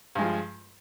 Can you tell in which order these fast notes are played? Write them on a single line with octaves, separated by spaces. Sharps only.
G2 G#3 F3